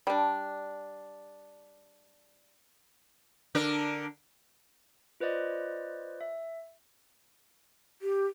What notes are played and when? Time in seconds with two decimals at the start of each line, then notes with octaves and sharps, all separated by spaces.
0.07 G3 D4
3.55 D3 D4 A#4
5.20 F4 B4 C5 D5 D#5
6.21 E5
8.02 G4